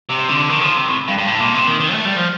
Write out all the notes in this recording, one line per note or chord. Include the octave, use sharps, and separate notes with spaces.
C3
D3
D#3
F3
C3
A2
G2
G2
A2
A#2
C3
D#3
D#3
A3
G3
F3